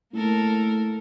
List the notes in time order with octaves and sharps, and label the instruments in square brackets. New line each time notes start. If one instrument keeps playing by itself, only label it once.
[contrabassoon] A2 [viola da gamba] A#3 A4 A#4